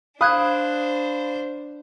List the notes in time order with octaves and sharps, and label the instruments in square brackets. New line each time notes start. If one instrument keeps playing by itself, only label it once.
[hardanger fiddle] D4 C5 [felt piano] F5 B5 [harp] D#6 F#6 G#6